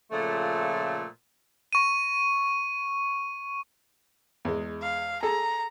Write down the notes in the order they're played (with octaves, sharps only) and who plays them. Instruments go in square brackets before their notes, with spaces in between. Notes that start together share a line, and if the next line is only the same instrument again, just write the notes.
[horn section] A#2 C#3 F3 A3
[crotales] C#6 D#7
[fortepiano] E2 G#3
[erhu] F5
[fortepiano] G#4 A4 [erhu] A#5